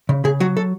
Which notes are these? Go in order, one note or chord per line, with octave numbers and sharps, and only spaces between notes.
C#3
C#3 G#4
F#3 F#4
A4